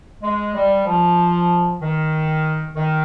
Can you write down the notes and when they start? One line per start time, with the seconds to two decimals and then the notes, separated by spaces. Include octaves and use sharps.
0.22 G#3
0.54 G3
0.86 F3
1.81 D#3
2.76 D#3